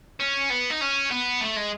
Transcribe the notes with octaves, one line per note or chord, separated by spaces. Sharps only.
C#4
B3
D#4
C#4
B3
A3
G#3